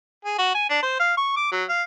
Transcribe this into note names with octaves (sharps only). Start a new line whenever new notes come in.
G#4
F#4
G#5
D4
C5
F5
C#6
D6
F#3
F5